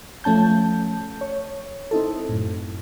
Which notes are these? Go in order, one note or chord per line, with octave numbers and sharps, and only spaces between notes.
F3 A3 C#4 A5 G6
C#5
C4 D#4 E4 A4
F#2 A2